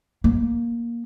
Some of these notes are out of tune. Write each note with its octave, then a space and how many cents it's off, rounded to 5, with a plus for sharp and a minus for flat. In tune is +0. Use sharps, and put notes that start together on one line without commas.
A#3 +10